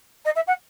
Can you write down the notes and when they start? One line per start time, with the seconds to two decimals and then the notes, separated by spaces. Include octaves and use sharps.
0.25 D#5
0.35 E5
0.47 F#5